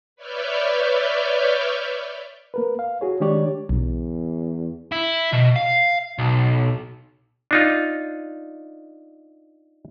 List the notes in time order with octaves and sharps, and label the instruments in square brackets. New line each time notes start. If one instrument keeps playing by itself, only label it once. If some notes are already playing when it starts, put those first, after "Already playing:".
[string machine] B4 C#5 D5 E5 F6 G6
[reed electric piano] A#3 A#4 B4
F5
F#4 G#4 C#5
D#3 G#3 D4 G4 C#5 D5
[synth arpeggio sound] B1 [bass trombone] E2
[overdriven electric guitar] E4
B2
F5
B1
[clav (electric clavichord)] D4 D#4 F4